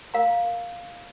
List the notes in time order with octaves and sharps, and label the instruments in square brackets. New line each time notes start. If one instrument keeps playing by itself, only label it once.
[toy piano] A#4 F5 A#5